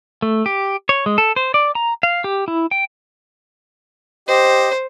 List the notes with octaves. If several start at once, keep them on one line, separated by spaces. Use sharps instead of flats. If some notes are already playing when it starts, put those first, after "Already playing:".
A3
G4
C#5
G#3
A4
C5
D5
A#5
F5
G4
E4
G5
G4 C5 D#5